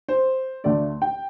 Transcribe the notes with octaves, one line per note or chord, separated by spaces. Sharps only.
C5
D2 D3 A3 D5
G5